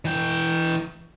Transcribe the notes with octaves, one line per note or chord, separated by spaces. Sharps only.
E3 G5